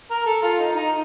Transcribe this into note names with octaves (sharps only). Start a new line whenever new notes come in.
A#4
A4
F4
D#4
D#4